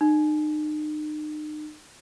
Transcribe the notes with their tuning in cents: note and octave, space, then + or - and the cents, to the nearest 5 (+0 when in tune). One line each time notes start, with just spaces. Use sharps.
D#4 -40